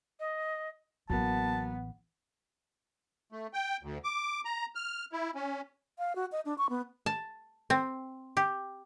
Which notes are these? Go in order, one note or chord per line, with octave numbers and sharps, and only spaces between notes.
D#5
A1 E3 F#3 A#3 B3 A5
A3
G5
D2
D6
A#5
F6
E4
C#4
F5
F#4
D#5
D4
C#6
B3
A5
C4
G4